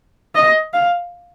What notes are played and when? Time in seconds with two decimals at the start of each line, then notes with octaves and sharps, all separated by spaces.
0.35 D#5
0.74 F5